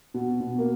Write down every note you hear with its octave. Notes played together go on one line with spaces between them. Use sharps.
B2
B2
A#3